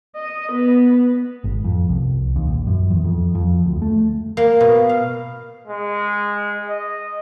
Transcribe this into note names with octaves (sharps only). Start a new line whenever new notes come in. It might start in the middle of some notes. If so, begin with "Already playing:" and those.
D#5
B3
G#1
F2
C2
D#2
A#1
F#2
E2
F2
F2
D2
A3
A#3
B2
F5
G#3
D#5